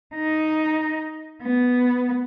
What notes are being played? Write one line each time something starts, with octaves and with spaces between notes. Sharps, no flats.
D#4
B3